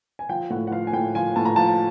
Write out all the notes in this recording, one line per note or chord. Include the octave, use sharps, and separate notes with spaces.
G#5
F3 G5
A2 F#5
F#5
F3 F5
G#5
A2 G5
F3 G#5
A2 A5
A#5
F3 A5